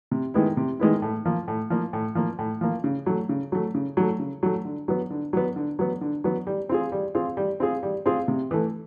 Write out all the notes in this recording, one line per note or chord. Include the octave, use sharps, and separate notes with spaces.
C3
D#3 G#3 B3 E4
C3
D#3 G#3 B3 E4
A2
F3 A#3
A2
F3 A#3
A2
F3 A#3
A2
F3 A#3
C#3
F#3 A3
C#3
F#3 A3
C#3
F#3 A3
C#3
F#3 A3
D3
F#3 B3
D3
F#3 B3
D3
F#3 B3
D3
F#3 B3
G3
C4 F4 G#4
G3
C4 F4 G#4
G3
C4 F4 G#4
G3
C4 F4 G#4
C3
E3 A3